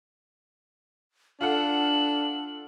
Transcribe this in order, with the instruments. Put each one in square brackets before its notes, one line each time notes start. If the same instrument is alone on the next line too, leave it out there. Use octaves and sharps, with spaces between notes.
[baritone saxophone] D4 [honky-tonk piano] F4 A4 F#5 [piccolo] F#7